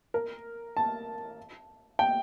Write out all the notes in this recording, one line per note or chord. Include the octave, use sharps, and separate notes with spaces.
A#4
A5
G5